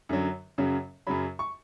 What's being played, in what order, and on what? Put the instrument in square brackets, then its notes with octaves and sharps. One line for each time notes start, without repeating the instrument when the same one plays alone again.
[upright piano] F#2 D3 F#3
F#2 C#3 F#3
F#2 C#3 F#3 B5
C#6